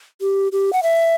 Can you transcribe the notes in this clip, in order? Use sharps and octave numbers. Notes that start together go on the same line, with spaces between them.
G4
G4
F#5
E5